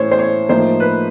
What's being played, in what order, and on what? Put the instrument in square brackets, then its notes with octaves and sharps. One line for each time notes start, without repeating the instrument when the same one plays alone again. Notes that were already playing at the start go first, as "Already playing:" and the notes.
Already playing: [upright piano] A2 E3 C#4 C5 C#5
C5
C#5
A2 F3 A#3 D#4 C5
B4